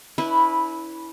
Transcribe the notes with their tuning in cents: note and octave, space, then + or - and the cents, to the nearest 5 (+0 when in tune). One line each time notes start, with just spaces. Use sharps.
C#4 +40 E4 -10 B4 +0